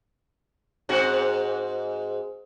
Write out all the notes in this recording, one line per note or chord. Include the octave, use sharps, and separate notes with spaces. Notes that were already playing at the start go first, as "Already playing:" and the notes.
G#2 C4 F#4